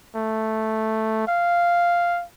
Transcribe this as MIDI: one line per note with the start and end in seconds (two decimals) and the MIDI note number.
0.15 1.26 57
1.27 2.24 77